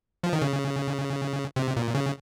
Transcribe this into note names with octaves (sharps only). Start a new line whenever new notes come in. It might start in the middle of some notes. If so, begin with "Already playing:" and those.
F3
D#3
C#3
C3
A#2
C#3